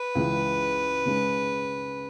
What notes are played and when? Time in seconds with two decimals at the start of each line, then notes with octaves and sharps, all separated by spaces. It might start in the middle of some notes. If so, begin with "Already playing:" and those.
Already playing: B4
0.15 C#2 C#3 E3 G#3
1.06 C#3 G#3 C#4